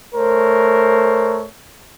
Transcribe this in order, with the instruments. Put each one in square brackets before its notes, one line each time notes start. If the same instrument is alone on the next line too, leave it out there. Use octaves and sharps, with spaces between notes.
[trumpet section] A3 A#4 C5 C#5